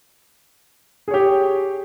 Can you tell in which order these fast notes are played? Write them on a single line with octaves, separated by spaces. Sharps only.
G#4 C#5 G4